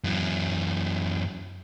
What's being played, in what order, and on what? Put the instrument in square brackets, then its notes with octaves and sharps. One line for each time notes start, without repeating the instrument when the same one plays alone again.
[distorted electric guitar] F#2 E3